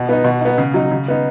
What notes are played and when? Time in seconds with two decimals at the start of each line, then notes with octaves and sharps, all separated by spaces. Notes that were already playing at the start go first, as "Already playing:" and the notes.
Already playing: B2
0.09 B3 D#4
0.24 B2
0.41 B3 D#4
0.58 C#3
0.74 F#3 D#4
0.91 C#3
1.08 B3 D#4